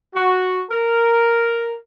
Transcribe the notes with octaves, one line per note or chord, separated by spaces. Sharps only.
F#4
A#4